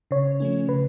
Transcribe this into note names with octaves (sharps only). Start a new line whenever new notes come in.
C#3 C#5
F3 A3 C#4
C#3 B4